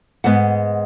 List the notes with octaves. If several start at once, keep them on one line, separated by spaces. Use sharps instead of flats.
G#2 G#3 B3 F#5